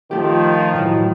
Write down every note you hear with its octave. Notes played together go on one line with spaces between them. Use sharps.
D#3 F3 A3 G4
A2 E3 F#3